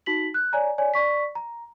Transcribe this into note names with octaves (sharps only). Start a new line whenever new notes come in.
D#4 F#4 B6 F#7
F#6
C#5 D5 G#5 A#5
C#5 D5 G#5
D5 C#6 B6
A#5